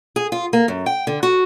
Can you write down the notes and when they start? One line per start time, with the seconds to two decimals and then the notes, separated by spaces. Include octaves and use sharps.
0.16 G#4
0.32 F4
0.53 A#3
0.68 F#2
0.86 G5
1.07 D3
1.23 F#4